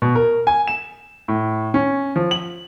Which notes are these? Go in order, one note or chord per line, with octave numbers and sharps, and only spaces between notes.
B2
A#4
G#5
E7
A2
C#4
F3
F#7